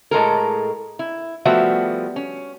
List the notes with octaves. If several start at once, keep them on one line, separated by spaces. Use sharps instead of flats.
A2 G#3 A4 A#4
E4
F3 G3 A3 B3 F#4 E5
C#4